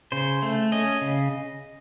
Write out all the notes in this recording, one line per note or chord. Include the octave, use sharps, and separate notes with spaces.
C#3 C5
A3
C#4 D#5
C#3